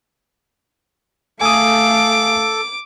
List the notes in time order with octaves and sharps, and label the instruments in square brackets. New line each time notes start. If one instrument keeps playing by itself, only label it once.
[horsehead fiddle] A3 F5 [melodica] A4 [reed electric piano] G#5 D#6 [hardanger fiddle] D6